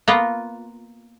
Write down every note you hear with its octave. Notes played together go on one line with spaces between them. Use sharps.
A#3 B3 F4